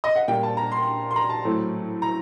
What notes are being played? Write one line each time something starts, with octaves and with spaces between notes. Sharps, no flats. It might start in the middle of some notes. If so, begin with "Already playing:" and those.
D#5
F#5
A#2 G3 A#3 G5
A5
A#5
C6
C6
A#5
A5
A2 F#3 A3 C4
A#5